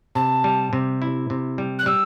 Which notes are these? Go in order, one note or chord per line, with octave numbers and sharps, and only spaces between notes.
C3 A5
G3
C3
E4
C3
G3
F#6
G3 E6